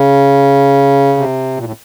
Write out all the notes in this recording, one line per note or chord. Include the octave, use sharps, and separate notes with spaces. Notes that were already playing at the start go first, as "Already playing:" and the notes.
Already playing: C#3
C3
A#2
A2